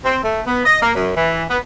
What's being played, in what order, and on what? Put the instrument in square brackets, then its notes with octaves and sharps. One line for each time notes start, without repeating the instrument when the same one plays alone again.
[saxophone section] C4
A3
B3
D#5
A#3
F#2
E3
B3